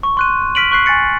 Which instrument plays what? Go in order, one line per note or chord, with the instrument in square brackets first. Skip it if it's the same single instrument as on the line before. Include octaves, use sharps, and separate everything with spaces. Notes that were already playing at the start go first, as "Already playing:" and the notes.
[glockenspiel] C#6
C6 F#6 D#7
F6 B6 D7 D#7 F#7
C#6 F#6 C7
G#5 C#6 A6 C#7